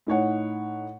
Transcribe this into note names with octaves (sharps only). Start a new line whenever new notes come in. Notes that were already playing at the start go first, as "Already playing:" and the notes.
A2 D#4 C#5 F#5